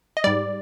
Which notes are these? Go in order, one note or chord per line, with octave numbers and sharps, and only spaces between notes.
D#5
G#2 G3 D5